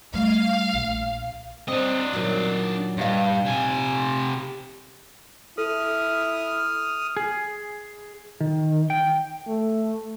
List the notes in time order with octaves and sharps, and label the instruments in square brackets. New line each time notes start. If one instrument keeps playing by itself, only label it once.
[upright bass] G3 A3 [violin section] F5
[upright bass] A#1
[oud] C4 [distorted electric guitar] D4 D#5
[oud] A#2 D#3 F#3
[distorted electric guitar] G2 [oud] A#2 D#4 F5
[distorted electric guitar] C3 G#5
[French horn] E4 [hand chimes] A4 [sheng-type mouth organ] D#6 F6
[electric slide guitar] G#4
D#3
G5
[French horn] A3